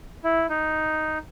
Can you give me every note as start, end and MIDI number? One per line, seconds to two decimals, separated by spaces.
0.24 0.46 64
0.49 1.18 63